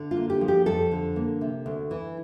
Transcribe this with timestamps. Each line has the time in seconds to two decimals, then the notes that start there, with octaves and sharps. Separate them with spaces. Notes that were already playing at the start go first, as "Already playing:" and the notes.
Already playing: D3
0.11 F4
0.17 A#3
0.30 G4
0.41 F3
0.48 G4
0.66 F2 A4
0.92 D3
1.16 A#3
1.41 C3
1.66 D2
1.91 E3